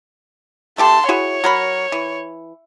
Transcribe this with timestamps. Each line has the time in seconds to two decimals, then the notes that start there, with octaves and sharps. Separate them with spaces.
0.78 A3 G4 A4 A5 C6
1.09 E4 F#4 G#4 C#5
1.44 F#3 A#4 B5
1.92 E3